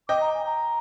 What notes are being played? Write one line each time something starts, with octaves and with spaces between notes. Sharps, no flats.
D#5 G5 D6
A#5
G#5
A#5